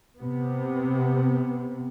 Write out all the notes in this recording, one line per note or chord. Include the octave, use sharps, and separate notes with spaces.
C3 B3